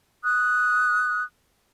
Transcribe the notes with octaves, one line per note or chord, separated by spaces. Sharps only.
D#6 F#6